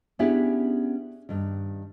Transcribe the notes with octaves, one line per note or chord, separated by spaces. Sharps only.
B3 C#4 D4 E4 G4 G#4
G2 D#3